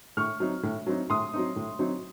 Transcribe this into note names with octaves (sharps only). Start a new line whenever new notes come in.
A2 C#6 F6
F#3 C4 D#4
A2
F#3 C4 D#4
A2 C6 D#6
F#3 C4 D#4
A2
F#3 C4 D#4